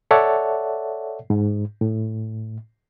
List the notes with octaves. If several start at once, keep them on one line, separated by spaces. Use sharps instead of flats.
A4 C#5 D5 E5 F#5 A5
G#2
A2